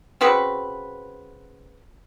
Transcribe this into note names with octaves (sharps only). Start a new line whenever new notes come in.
C#3 C4 F#4 B4